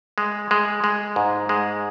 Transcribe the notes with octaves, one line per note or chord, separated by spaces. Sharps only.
G#3
G#3
G#3
G#2
G#3